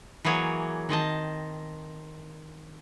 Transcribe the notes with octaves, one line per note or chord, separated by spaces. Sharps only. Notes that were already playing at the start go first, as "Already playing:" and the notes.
E3 F#3 A#3 G#4 C#5
D#3 C4 D#5 A5